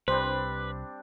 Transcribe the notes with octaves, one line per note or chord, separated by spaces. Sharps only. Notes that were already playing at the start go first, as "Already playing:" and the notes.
C2 G3 C4 D4 B4 C5